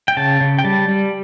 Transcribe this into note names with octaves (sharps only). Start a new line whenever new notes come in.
G5
C#3 A5
C#3
G5
G3 A5
G3